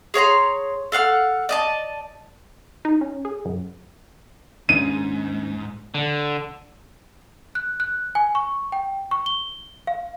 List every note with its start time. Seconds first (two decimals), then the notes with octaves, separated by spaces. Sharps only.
0.14 G#4 C#5 A#5 C6
0.92 A4 F5 F#5 F6
1.49 D5 D#5 A5
2.85 D#4
3.01 C#4
3.25 G#4
3.45 F#2
4.69 D#2 G#2 C#4 D4 D#7
5.94 D3
7.55 F#6
7.80 F#6
8.15 G#5
8.35 C#6
8.72 G5
9.11 C#6
9.26 G7
9.87 F5